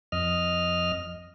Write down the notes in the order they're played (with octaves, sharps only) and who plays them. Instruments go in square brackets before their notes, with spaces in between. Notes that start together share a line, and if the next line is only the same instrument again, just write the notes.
[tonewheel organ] F2 D#5 F6